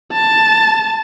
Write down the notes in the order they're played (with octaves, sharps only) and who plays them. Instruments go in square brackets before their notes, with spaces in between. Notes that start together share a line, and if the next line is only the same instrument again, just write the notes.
[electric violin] A5